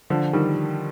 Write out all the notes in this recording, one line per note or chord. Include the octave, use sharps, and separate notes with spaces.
D3 F3
D#3 G3